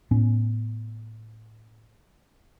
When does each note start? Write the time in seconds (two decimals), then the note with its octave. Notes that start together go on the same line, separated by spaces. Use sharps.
0.11 A2 B3 C#4